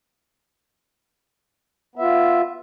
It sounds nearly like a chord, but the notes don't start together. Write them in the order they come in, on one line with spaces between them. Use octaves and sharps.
B3 E5 F4